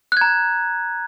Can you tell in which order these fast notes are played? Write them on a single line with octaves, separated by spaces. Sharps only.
F#6 G#6 A#5